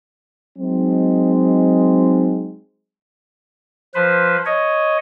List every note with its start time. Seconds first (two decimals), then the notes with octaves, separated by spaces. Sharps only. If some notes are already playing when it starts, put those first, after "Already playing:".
0.58 F#3 G#3 C4 D#4
3.95 F3 B4 C5
4.46 C#5 D#5